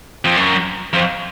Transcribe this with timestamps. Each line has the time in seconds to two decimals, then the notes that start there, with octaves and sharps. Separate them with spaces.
0.25 F2
0.36 F#2
0.93 F2